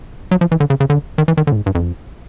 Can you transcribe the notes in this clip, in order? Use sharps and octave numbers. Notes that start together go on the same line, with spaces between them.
F#3
F3
E3
D3
C#3
C#3
D3
D#3
E3
D#3
D3
A2
G#2
G2
F2